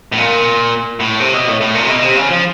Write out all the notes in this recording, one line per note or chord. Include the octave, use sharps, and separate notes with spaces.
A2
A#2
A2
C3
B2
A2
A2
A#2
C3
B2
C3
C#3
F3